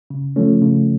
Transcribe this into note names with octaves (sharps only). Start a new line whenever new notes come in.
C#3
F3 A3 C#4
C#3